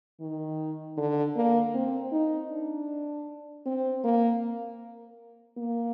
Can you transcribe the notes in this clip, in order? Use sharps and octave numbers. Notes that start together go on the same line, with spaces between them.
D#3
D3
A#3
C4
D#4
D4
C4
A#3
A#3